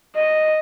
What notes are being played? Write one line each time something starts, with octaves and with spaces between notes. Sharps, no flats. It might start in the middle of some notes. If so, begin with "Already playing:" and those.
D#5